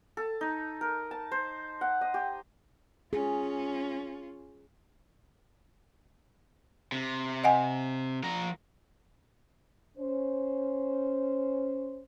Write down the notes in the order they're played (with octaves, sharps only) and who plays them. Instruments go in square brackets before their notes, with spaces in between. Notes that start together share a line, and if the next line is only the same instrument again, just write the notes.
[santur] A4
D#4
A#4
A5
C5
F#5
D#5
G4
[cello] C#4 F4 [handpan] G#4
[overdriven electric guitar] C3
[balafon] D#5 F#5 G#5
[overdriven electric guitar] F3 A#5
[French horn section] C#4 C5